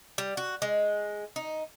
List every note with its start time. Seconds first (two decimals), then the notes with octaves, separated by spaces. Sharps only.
0.18 G3
0.37 F#4
0.62 G#3
1.36 D#4